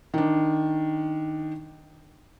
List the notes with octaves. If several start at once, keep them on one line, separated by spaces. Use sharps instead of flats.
D#3 D4